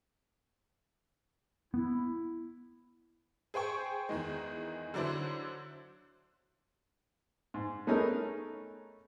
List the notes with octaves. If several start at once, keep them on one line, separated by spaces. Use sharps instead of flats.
B3 E4
G#4 C5 G5 C#6
E2 D#3 G#3
D3 F#3 D4 E4 C5
G#2
A3 B3 C#4 D#4 G#4 A#4